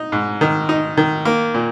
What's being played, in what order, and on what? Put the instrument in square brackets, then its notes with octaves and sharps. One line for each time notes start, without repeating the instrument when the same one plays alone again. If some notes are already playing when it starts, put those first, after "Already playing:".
Already playing: [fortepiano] D#4
G#2
D#3
D#4
D#3
A#3
A#2